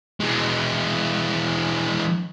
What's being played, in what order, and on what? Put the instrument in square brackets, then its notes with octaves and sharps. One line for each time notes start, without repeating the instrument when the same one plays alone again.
[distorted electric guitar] E3 G#3